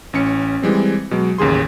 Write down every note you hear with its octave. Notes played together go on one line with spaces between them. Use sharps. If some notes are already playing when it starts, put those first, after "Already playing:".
A1 C#4 C#7
E3 G3 G#3 C4
B2 F#3 G#3
A1 D#2 C#3 G#4 C6